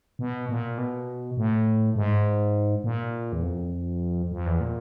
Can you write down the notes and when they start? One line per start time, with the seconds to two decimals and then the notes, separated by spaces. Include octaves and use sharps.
0.19 B2
0.49 A#2
0.78 B2
1.37 A2
1.96 G#2
2.84 A#2
3.33 E2
3.43 F2
4.32 F2
4.46 E2
4.61 A#2